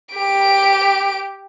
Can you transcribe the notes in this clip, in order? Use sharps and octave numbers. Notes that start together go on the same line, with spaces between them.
G4 D7